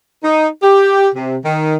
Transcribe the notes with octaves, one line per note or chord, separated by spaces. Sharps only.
D#4
G4
C3
D#3